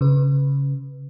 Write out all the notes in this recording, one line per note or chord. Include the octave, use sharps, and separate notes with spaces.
C#3 B4